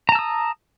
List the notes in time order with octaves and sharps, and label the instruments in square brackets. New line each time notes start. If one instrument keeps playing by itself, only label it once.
[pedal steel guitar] A#5
A5
E6
D#6